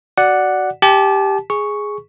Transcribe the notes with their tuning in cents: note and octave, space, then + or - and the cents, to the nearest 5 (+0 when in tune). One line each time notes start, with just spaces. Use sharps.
F#4 +15 D5 +0 F#5 +0
G4 +0 A5 -35
G#4 +0 C#6 +0